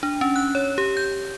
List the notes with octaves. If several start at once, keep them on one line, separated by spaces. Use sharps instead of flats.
D4
C#4
F#6
C#5
G4
G6